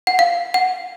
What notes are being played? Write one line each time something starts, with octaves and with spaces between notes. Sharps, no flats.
F#5
F5
F#5